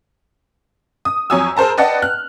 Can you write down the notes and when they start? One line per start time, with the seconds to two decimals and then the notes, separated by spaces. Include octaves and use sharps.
1.05 D#6
1.30 F2 F#3 C#5 G#5 D#6 E6
1.56 G#4 A#4 C5 A5 A#5
1.78 B4 D5 D#5 F#5 G5 A5
2.02 F6 F#6